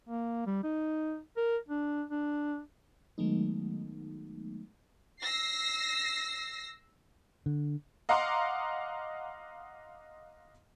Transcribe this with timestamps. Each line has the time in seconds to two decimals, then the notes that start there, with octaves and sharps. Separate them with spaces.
0.09 A#3
0.46 G3
0.63 D#4
1.37 A#4
1.68 D4
2.11 D4
3.18 D#3 F#3 G#3 A3 B3 D#4
5.23 E6 A#6 C7
7.46 D3
8.09 D#5 F5 F#5 A#5 C6 D6